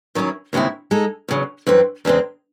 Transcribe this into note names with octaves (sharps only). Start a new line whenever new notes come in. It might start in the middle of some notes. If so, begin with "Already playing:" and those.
D#3 F#3 C#4 E4
D#2 C#3 G#3 C4 E4
G#3 D#4 A4
E2 C#3 F#3
F#2 E3 C4
E2 C#3 G#3 C4